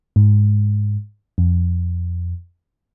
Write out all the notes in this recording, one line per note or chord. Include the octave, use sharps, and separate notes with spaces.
G#2
F2